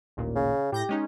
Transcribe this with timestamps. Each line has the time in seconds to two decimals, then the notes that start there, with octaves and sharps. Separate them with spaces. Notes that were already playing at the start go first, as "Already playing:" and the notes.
0.17 A1 D#2 A#2
0.36 C#3
0.72 A2 G4 G6 A#6
0.89 G#3 C#4 D#4